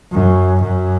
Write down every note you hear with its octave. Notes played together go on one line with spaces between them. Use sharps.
F#2
F#2